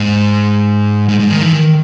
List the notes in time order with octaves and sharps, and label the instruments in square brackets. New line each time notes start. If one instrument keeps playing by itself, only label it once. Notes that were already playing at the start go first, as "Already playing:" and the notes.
Already playing: [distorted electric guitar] G#2
G#2
G#2
D#3
E3
D#3